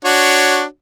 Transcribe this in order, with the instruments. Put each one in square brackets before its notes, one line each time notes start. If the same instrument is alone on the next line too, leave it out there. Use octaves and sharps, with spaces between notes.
[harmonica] D4 F#4 C#5